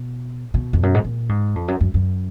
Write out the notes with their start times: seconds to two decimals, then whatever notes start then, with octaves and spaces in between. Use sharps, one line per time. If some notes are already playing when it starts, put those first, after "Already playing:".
Already playing: B2
0.54 B2
0.73 F2
0.83 F#2
0.94 G#2
1.04 A#2
1.29 G#2
1.56 F2
1.68 F#2
1.81 F#2
1.94 F#2